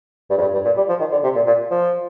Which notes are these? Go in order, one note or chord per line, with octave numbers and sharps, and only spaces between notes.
G2
F2
G2
G2
A#2
G3
F3
D#3
D3
C3
A#2
A#2
F3